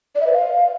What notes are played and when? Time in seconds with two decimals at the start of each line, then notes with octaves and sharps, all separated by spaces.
0.15 D5
0.21 E5
0.26 B4
0.32 F5